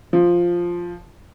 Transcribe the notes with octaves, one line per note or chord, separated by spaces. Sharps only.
F3